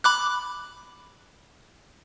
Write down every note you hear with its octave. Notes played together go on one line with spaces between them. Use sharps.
B5 D6 F#6